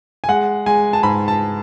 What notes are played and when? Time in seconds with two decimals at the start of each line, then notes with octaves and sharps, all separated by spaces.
0.24 G#5
0.28 G#3 F#5
0.66 G#3 G#5
0.93 A5
1.03 G#2 B5
1.28 A5